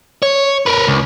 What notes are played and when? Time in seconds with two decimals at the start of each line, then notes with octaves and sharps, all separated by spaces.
0.22 C#5
0.66 A#4 B4
0.87 C#2